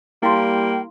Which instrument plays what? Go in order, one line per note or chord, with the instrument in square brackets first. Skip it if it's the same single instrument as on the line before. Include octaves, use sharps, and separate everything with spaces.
[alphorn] G3 [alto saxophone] A#3 [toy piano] E4 F5 C6 [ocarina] G5